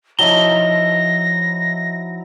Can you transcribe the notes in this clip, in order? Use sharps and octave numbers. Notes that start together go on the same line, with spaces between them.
F3 F#3 D#4 E4 A5 A#5 A#6 G7